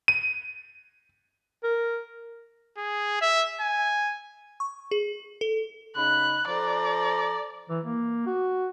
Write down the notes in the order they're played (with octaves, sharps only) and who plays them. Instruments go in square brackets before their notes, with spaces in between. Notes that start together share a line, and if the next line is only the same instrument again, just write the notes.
[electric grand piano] D#7
[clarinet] A#4
[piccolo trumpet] G#4
E5
G#5
[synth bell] C#6
G#4
A4
[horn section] C#3 D#4 B5 [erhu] F#6
[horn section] F3 A4 A#5 [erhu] D5
[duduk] E3
A#3
F#4